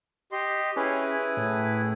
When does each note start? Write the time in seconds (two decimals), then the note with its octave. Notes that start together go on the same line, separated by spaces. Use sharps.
0.32 G4 D#5 C6
0.76 C#4 E4 G#4 B4
1.37 A2